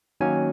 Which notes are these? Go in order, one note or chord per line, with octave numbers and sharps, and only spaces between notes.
D#3 F#3 A#3 C#4 G#5